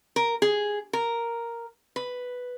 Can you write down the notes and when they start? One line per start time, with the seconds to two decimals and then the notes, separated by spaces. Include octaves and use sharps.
0.16 A#4
0.42 G#4
0.93 A#4
1.96 B4